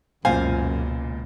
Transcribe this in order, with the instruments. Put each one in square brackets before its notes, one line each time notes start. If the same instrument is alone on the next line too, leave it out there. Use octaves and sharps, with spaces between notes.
[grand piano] E1 A#2 [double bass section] C#2 [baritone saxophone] F#2 [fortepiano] C5 F5 G#5